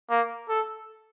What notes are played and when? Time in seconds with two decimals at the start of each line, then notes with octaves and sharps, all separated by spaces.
0.10 A#3
0.49 A4